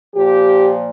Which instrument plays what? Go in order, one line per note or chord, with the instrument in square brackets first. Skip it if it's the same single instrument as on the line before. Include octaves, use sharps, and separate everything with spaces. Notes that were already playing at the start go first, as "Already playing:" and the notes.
[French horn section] A#2 F3 G4